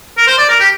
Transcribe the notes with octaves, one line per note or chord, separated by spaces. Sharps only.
A#4
C5
D5
A#4
G4